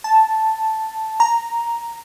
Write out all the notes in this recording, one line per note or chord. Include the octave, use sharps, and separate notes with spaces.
A5
A#5